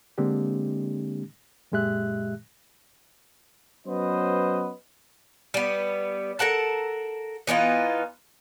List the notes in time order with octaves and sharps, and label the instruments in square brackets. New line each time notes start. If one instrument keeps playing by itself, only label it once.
[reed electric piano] D3 G#3 A#3 C4 D4 G4
F#2 A#2 G#3 G4 E5 F#6
[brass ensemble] F#3 B3 C#4 B4 C5 D#5
[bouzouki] G3 B3
A4 A#4 F#5 A5
E3 B3 D#4 F4